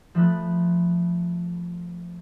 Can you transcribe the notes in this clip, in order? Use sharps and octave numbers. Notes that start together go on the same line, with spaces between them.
F3 A3 B4